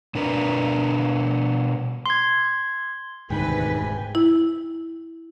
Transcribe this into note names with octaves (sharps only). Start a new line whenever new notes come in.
B2 D4 A#4 B4
C6 G#6
E1 D2 G#2 C3 D#3 B4 G5 G#5
E4